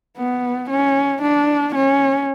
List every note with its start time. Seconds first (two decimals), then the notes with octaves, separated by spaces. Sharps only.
0.17 B3
0.70 C#4
1.22 D4
1.75 C#4